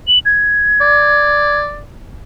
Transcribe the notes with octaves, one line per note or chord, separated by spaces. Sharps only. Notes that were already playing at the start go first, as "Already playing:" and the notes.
F#7
G#6
D5